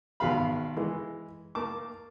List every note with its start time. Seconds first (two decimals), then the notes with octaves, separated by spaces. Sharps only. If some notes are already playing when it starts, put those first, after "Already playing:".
0.20 G#1 B2 G#4 B4 F5 B5
0.76 E3 G#3
1.55 A#3 A5 D6